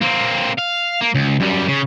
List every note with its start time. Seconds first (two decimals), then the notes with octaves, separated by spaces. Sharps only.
0.01 A#3 C4
0.58 F5
1.01 A#3
1.14 C#2
1.40 F#2 G3
1.68 C#3